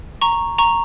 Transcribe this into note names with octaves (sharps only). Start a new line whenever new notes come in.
A#5 C#6
A#5 C#6